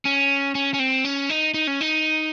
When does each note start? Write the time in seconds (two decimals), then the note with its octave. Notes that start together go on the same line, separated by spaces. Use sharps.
0.05 C#4
0.55 C#4
0.74 C#4
0.79 C4
1.05 C#4
1.29 D#4
1.54 D#4
1.67 C#4
1.81 D#4